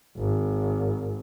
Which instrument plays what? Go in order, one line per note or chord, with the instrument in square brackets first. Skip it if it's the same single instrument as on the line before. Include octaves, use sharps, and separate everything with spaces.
[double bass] G#1